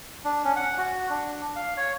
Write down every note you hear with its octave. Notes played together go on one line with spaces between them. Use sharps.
D4
C#4
F#5
F#4
D4
F5
C#5